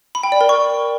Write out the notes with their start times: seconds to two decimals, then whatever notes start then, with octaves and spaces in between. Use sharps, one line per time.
0.15 B5
0.23 G5
0.32 D5
0.41 A#4
0.49 C#6